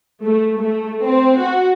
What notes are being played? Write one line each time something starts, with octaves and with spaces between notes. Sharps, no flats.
A3
A3
C4
F#4